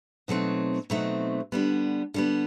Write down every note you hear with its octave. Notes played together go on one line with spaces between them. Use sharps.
B2 F#3 A3 C4 D#4
B2 F#3 A3 C4 D#4
D3 G3 B3
D3 G3 B3